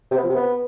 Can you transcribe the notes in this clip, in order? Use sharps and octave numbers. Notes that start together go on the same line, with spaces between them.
C3
B3
F3
C3
B3